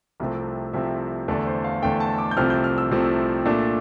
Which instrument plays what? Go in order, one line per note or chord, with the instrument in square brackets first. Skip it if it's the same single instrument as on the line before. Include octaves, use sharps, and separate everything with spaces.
[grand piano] C2 C3 F3 A3 C4
C2 C3 F3 A3 C4 E5
E2 D3 A3 D5
C5
F5
E2 D3 A3 G5
A5
D6
G6
C2 C3 F3 A3 C4 F6
G6
F6
E6
C2 C3 F3 A3 C4
A#2 A3 D4